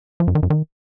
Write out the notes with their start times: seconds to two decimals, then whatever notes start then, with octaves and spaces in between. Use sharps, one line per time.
0.20 F3
0.28 F#2
0.35 D#3
0.43 F#2
0.50 D#3